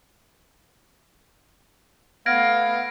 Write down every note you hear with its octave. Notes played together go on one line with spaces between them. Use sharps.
A3 B3 F5 G#6 A#6 D7